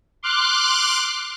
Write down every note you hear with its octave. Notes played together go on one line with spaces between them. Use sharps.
C6 D6 F6 F#6